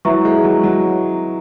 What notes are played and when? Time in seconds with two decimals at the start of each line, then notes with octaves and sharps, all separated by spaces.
0.05 F#3 E4 B4 E5 A#5 C#6
0.25 G#3
0.44 F#3
0.63 F#3